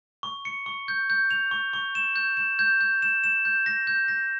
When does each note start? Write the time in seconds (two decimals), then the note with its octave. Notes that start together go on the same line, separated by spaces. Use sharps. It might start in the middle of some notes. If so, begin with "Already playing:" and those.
0.23 C#6
0.45 C#7
0.66 C#6
0.88 G6
1.10 G6
1.31 F7
1.51 C#6
1.73 C#6
1.95 E7
2.16 G6
2.37 E7
2.59 G6
2.81 G6
3.02 E7
3.24 E7
3.45 G6
3.66 A#6
3.87 G6
4.08 A#6